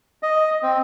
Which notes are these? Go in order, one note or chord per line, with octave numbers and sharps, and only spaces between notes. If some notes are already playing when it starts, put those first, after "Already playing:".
D#5
C4